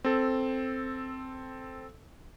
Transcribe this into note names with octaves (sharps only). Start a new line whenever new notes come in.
C4 A4